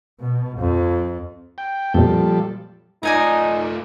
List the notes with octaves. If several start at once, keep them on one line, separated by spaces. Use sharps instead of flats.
B2
F2
G5
F2 A#2 F3 G3 A4
A3 D#4 F4 D5 G#5 A#5